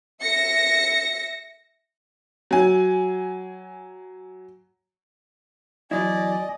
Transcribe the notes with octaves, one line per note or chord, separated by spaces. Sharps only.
E5 A#6 C#7
F#3 G#5
E2 F#3 E4 D5 D#5 G#5